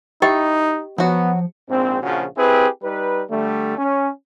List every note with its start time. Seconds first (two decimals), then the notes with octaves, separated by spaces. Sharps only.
0.22 D#4 E4 G4 D#5 G5
0.98 F3 F#3 B3 F#4
1.69 A#1 G#2 C4
2.02 A#1 C#3 F3 F#4
2.37 C4 E4 G4 G#4 B4
2.82 G3 D#4 B4
3.30 D3 G3 A3
3.77 C#4